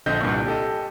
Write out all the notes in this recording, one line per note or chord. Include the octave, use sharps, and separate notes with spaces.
A#1 D3 C4 D#5 G6
C2 G2 A#2 C#6
G4 A4 D#5